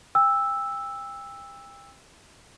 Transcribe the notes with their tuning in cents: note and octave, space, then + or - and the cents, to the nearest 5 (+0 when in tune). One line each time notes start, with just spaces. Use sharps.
G5 +35 E6 +0